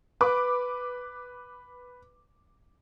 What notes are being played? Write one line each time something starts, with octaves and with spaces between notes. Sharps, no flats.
B4 D6